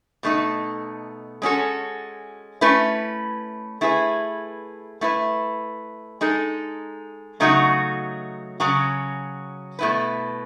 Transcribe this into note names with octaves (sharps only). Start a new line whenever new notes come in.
B2 A3 D#4 A4
G#3 C#4 F#4 A4
A3 C#4 E4 B4
A3 E4 G#4 B4
A3 E4 B4
G#3 D#4 A4
C#3 F#3 A3 D#4 F#4
C#3 F#3 C#4 F#4
B2 A3 E4 B4